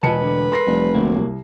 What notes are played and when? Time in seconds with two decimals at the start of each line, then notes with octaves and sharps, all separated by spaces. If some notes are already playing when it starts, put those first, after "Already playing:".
0.03 E1 F4 B4 D#5 G#5 A5 C#7
0.20 D2 D3
0.52 A4 A#4 C6 A#6 C7
0.66 F1 F2 G3
0.94 D2 F#3 A#3
1.16 C2